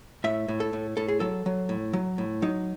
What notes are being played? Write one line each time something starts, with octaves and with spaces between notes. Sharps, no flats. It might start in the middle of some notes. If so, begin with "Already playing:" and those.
A2 E5
A2
A4
A2
A2 A4
G#4
F#3 A4
F#3
A2
F#3
A2
F#3 D#4